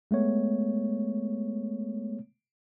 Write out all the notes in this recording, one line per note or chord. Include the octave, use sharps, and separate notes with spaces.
G#3 A3 B3 C#5